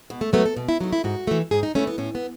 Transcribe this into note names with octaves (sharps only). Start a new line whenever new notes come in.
B2
A3
F#3 A3 B3
A4
B2
E4
F#3 A3 D#4
E4
G#2 F#4
E3 A3
G#2 G#4
D#4
E3 A3 C#4
B3
A2 C#4
B3